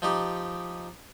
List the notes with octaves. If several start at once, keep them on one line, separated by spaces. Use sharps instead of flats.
F3 D#4 G4